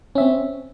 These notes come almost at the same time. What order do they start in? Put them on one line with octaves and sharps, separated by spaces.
C#4 E5 C4